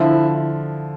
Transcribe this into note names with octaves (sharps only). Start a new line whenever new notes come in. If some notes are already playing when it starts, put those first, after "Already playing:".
Already playing: D3 F3 E4